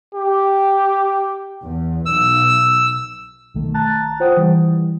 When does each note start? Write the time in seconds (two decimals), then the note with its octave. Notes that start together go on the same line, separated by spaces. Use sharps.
0.15 G4
1.63 E2
2.06 B1 E6
3.54 B1 D#3 A3
3.74 A5 A#5 F#6 A6
4.20 F4 C5 F#5 G5 D#6
4.37 E3 G3